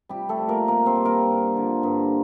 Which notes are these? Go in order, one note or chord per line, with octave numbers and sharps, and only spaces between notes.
C3 G3 G4
A3 A4
F3
A#3 A#4
C3 A#3 A#4
C4 C5
G3
A#3 A#4
G2
D3 F3
G2